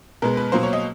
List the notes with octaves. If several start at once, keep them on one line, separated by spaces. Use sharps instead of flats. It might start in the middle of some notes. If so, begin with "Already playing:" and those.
B2 G#3 B3 A#4
B4
B2 F#3 A#3 C5
C#5
D#5